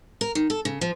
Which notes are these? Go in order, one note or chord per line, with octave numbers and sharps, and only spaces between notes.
A#4
D#3
A4
C#3
F3